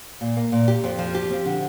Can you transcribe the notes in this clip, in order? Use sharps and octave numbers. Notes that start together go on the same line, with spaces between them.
A#2
A#3
A#2
G4
F2
F3
G4
C4
D3